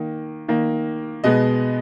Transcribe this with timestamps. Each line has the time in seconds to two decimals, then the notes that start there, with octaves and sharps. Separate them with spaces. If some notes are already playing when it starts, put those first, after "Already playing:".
Already playing: D#3 A#3
0.48 D#3 A#3
1.24 B2 G#3 B3 D#5